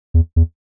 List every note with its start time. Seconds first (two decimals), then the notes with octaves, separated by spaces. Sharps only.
0.14 E2
0.36 E2